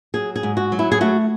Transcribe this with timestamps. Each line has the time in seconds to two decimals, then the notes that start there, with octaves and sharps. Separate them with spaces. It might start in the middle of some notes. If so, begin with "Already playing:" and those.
0.14 F#3 G#4
0.36 G#4
0.43 G#2
0.57 F#4
0.72 F#3
0.79 E4
0.92 G#4
1.01 A3 F#4